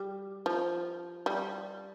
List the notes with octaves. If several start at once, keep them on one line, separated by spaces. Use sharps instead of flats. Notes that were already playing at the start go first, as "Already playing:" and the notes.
Already playing: G3
F3
G3